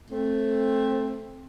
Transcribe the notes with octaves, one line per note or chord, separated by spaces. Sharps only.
A3 C4